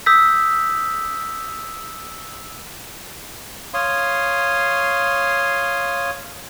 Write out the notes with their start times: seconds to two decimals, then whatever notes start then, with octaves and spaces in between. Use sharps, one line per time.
0.06 D#6 E6 G6 B6
3.74 C#5 F5 C6 D#6